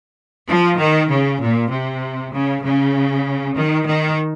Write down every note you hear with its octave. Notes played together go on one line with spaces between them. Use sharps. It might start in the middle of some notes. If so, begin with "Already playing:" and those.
F3
D#3
C#3
A#2
C3
C#3
C#3
D#3
D#3